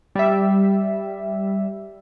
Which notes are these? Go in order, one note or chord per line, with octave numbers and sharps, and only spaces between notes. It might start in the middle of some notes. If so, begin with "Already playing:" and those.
G3 E5